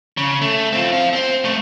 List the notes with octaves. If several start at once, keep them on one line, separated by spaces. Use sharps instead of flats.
C#3
A3
C4 F4
C5 F5
C4 C5
C2 A3